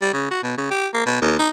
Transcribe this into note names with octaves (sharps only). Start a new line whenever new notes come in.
G3
C#3
F#4
B2
C#3
G4
A#3
B2
D#2
D#4